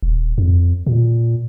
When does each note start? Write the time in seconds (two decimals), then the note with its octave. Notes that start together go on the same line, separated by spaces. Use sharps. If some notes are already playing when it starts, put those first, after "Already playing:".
0.03 D#1
0.38 F2
0.87 A#2